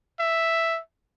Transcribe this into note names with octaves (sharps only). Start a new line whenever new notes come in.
E5